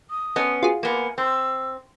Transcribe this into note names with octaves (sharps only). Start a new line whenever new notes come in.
D#6
B3 C#4 D#5
F4 F#4 G#4
A#3 B3 G#5
C4 E6